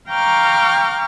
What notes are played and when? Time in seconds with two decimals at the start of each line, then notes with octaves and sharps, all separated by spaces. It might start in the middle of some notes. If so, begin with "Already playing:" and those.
0.10 F5 G5 A#5 C#6 D6 F6